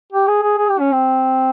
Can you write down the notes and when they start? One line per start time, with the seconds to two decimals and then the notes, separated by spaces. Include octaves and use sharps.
0.12 G4
0.27 G#4
0.42 G#4
0.58 G#4
0.70 G4
0.80 C#4
0.92 C4